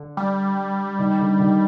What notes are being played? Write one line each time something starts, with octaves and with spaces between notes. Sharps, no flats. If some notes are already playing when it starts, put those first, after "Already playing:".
Already playing: D3
G3
D#3
D3
D#3